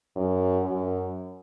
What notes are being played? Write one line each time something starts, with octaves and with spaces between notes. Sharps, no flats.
F#2
F#2